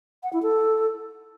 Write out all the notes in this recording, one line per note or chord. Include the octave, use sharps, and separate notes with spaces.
F#5
E4
A4